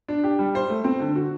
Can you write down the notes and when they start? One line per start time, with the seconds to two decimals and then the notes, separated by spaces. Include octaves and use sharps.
0.08 D4
0.24 G4
0.39 G3
0.55 C5
0.70 A3
0.84 C4
1.00 D3
1.15 F#4